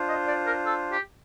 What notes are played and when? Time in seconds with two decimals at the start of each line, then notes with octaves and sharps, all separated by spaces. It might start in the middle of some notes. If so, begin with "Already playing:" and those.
Already playing: D4 F4 C5
0.09 D#5
0.28 D5
0.47 A#4
0.66 A4
0.92 G4